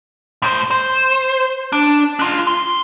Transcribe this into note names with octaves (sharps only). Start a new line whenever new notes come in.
A2 C5
C5
D4
D4 F4
C6